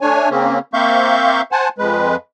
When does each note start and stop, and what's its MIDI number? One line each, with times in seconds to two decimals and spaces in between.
0.01 0.29 57
0.01 0.29 62
0.01 0.29 73
0.01 0.29 80
0.30 0.59 49
0.30 0.59 58
0.30 0.59 60
0.30 0.59 61
0.74 1.41 58
0.74 1.41 60
0.74 1.41 76
0.74 1.41 77
0.74 1.41 85
0.74 1.41 91
1.52 1.69 72
1.52 1.69 78
1.52 1.69 80
1.52 1.69 81
1.78 2.16 41
1.78 2.16 56
1.78 2.16 71